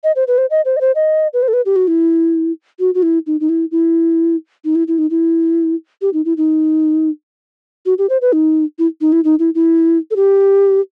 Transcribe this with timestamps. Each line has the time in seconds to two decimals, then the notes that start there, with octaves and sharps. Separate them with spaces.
0.04 D#5
0.16 C5
0.27 B4
0.38 C5
0.50 D#5
0.65 C5
0.77 D#5
0.81 C5
0.95 D#5
1.33 B4
1.42 C5
1.48 A4
1.53 B4
1.66 G4
1.76 F#4
1.87 E4
2.79 F#4
2.95 F#4
3.03 E4
3.27 D#4
3.40 D#4
3.49 E4
3.71 E4
4.64 D#4
4.75 E4
4.88 E4
4.98 D#4
5.10 E4
6.02 G4
6.13 D#4
6.25 E4
6.37 D#4
7.86 F#4
7.98 G4
8.10 C5
8.21 B4
8.33 D#4
8.79 E4
9.01 D#4
9.12 E4
9.24 D#4
9.39 E4
9.55 E4
10.11 A4
10.16 G4